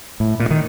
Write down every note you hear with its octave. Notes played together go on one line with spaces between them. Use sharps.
A2
A#2
D#3